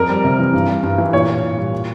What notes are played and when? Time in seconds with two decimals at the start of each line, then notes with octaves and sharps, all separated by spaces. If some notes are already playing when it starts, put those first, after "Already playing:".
Already playing: F2 A#4
0.09 G3
0.24 C3
0.39 E3
0.54 G2
0.68 G3
0.83 G2
0.98 E3
1.13 A#2 C#5
1.27 A#2
1.43 A#2
1.57 G3
1.72 A#2